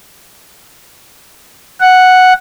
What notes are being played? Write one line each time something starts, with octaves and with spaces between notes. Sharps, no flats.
F#5